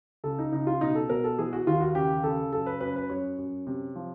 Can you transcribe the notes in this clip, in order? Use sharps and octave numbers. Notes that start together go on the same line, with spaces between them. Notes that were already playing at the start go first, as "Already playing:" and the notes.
C#2 A4
D#4
C#2 D#4
F4
B2 D#4
A4
B2 A#4
A4
E3 G#4
F#4
D#2 F4
F#4
C#3 G4
C#3 A4
F#2 A4
B4
F#2 B4
B4
F#2 C#5
F#2
C3
F3